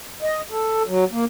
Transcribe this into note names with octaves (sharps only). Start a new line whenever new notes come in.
D#5
A4
F#3
A#3